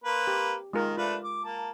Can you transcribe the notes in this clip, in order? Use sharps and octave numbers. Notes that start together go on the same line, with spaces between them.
A#3 B4 C5
G4
D#3 G#3 F4 A#4
A3 D4 F4 B4
D6
A#3 A5